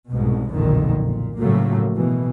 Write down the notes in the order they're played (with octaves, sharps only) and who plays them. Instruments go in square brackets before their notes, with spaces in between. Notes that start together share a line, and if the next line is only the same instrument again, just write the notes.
[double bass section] C2 G#2 B2
F#1 B1 F2 A#2 D3 D#3
A#2
A2 C#3 F3 F#3 A3 A#3
B2 E3